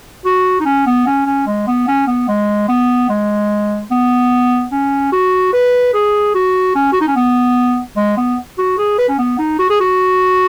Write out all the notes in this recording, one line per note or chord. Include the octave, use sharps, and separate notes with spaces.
F#4
D#4
C#4
B3
C#4
C#4
G#3
B3
C#4
B3
G#3
B3
G#3
B3
C#4
F#4
B4
G#4
F#4
C#4
F#4
D#4
C#4
B3
G#3
B3
F#4
G#4
B4
C#4
B3
D#4
F#4
G#4
F#4